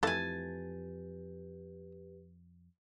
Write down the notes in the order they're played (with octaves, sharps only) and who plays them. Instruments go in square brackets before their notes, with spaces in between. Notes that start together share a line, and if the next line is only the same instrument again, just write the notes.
[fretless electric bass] F2 [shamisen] E3 A3 [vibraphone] G4 B4 [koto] G#5 A5